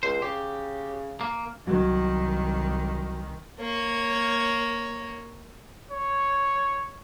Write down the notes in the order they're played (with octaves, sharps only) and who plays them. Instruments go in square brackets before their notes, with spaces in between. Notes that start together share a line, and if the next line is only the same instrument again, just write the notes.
[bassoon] C#2 [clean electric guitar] C5
[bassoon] C#3 [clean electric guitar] G4
[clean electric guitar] A#3
[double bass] C2 D#3 [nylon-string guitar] F#3
[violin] A#3 C#5
[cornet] C#5